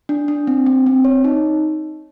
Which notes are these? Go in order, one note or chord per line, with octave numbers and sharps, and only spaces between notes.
D4
D4
C4
C4
C4
C#5
D#4